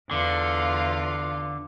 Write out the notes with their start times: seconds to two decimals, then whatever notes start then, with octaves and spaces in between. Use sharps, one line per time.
0.11 E2 D3 F4 F5